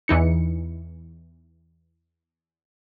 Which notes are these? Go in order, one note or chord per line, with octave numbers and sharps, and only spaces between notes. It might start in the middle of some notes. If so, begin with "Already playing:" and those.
E2 E3 D#4 C#7